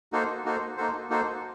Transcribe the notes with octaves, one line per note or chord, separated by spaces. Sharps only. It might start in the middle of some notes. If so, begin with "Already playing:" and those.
A#3 D#4 F#4 A4 C5
A#3 D#4 F#4 A4 C5
A#3 D#4 F#4 A4 C5
A#3 D#4 F#4 A4 C5